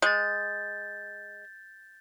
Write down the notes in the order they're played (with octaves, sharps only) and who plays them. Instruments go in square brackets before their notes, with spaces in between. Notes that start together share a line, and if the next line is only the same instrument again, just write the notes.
[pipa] G#3 [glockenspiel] G6 A6